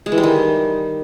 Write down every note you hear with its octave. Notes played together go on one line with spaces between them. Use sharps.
G#3
E3
G3
D#3